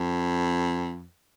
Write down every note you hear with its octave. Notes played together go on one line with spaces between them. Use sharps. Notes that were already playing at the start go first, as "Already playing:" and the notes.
Already playing: F2